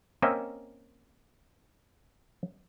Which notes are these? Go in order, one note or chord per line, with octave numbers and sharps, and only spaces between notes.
A#3 C4 C#4 D#5 E5